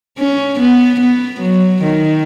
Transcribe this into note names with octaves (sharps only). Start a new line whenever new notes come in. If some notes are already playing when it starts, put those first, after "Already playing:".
C#4
B3
B3
F#3
D#3